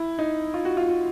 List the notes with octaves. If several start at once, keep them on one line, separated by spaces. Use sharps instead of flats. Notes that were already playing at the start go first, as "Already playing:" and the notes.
Already playing: E4
D#4
F4
F#4
F4
F#4